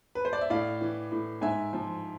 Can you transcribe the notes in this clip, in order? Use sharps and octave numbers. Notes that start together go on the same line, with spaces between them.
B4
C5
D5
E5
A2 D5 F5
E3
A2
G#2 E5 G#5
F3